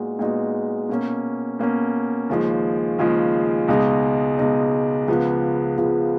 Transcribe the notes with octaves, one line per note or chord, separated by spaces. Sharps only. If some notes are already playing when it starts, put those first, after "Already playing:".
Already playing: A#2 G#3 B3 D#4 F#4
A#2 G#3 B3 D#4 F#4
B2 A#3 C#4
B2 A#3 C#4
D#2 C#3 F3 G#3
D#2 C#3 F3 G#3
C#2 B2 G#3 D#4
C#2 B2 G#3 D#4
C#2 C#3 F3 B3
C#2 C#3 F3 B3